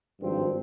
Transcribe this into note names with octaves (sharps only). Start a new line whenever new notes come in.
G#1 G2 F3 C4